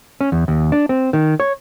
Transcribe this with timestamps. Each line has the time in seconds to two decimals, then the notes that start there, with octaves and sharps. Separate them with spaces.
0.21 C#4
0.32 E2
0.48 D#2
0.72 D4
0.89 C4
1.13 D#3
1.40 C#5